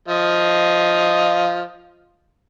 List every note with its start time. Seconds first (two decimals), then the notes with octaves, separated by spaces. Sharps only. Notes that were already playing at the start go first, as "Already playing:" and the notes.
0.08 F3 D#5 F5